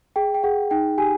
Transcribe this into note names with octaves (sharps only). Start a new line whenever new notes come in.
G#4 G5
G5
G#4 F#5
D#4 G5
G4 G#5